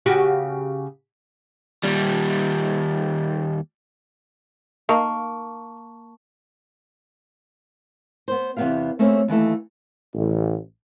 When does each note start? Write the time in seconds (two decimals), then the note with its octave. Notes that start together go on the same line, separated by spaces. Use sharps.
0.06 C#3 F#4 G4
1.83 D#2 G3
4.89 A#3 D#4 A#4 F5 A5 C#6
8.28 B3 C5
8.57 E2 C3 F#3 B3 G4 F5
8.99 A3 A#3 C4 C#4 G4
9.28 D#2 E3 A3 A4
10.15 A1